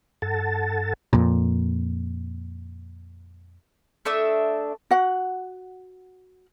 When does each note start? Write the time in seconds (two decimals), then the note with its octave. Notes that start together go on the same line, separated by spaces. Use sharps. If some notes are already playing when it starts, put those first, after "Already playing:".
0.22 G2 A4 F#5 A5 A6
1.13 F2 A#2
4.05 A3 D4 E5 D#6
4.91 F#4 F#5